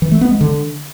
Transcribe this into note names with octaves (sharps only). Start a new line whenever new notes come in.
E3
A3
B3
G#3
D3